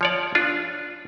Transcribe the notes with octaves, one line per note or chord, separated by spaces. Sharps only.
F3 C#5 D5
D4 F4